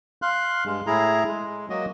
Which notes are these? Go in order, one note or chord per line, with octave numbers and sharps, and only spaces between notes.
F5 C6 F#6
G2 G#3
A2 E4 G#4 A#5
G#3
F#3 A#3 F#4 D#5